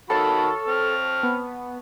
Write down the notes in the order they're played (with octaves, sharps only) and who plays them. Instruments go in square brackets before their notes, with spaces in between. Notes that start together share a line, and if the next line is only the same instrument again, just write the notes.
[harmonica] D#3 F#4 B5 [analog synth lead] A4 [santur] C#5 F5 A5
[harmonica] C4 F6
[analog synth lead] B3